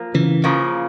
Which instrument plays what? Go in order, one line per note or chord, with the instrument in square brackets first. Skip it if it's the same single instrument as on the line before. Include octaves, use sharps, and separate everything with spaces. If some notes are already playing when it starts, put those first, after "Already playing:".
Already playing: [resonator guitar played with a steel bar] F3 A#3
[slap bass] C#3 E3
[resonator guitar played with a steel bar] C#3 F3 A#3